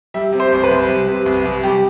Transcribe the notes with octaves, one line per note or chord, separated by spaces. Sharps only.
G3 E5
C3
C5
C2 C5
B4
C2
G3
C3
C2
C2
G3 G4